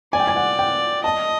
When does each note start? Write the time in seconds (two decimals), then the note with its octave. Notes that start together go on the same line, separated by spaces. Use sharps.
0.13 D5 G#5
0.20 G5
0.27 G#5
0.36 F#5
0.59 G5
1.04 D#5 A5